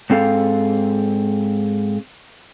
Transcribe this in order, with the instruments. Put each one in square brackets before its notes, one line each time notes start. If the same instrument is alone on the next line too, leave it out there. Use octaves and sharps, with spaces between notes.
[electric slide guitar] G#2 C4 A4 F5